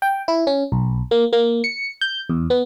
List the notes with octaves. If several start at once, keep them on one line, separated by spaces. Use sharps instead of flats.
G5
E4
C#4
B1
A#3
A#3
C#7
G6
E2
B3